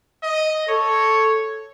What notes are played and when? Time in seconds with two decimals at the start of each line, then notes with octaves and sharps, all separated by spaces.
0.23 D#5
0.69 A4 C#5